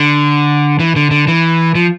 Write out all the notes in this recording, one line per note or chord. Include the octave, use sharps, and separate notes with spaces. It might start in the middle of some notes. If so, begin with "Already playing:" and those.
Already playing: D3
E3
D3
D3
E3
F3